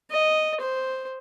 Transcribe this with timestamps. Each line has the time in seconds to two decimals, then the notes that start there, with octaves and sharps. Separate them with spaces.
0.11 D#5
0.60 C5